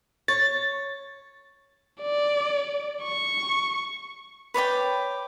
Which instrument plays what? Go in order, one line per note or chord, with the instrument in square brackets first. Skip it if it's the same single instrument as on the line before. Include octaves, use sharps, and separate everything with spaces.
[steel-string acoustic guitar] C#5 [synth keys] A6
[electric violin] D5
C#6
[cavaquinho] B4 C#5 D5 G5